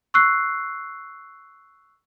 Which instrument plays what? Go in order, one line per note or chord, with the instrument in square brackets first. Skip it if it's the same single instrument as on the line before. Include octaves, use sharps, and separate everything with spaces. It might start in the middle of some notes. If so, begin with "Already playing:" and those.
[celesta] C#6 E6 F#6 C7